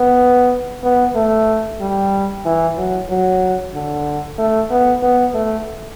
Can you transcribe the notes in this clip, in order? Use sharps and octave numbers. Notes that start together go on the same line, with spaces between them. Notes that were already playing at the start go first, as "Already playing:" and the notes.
Already playing: B3
B3
A3
G3
E3
F#3
F#3
D3
A3
B3
B3
A3